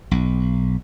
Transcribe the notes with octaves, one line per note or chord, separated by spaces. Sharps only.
B1